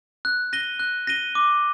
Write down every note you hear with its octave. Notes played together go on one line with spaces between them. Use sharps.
F#6
A#6 D#7 G7
F#6
A#6 D#7 G7
D6